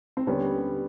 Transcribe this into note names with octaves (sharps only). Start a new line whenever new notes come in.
C4
D#2 D3 G3 B3 C#4